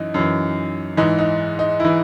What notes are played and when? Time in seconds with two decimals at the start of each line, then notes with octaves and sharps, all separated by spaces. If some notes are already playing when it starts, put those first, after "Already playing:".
Already playing: F#2 E3 D#4
0.14 F#2 E3
0.97 G#2 E3 D#4
1.19 D#4
1.59 D#4
1.80 E3 E4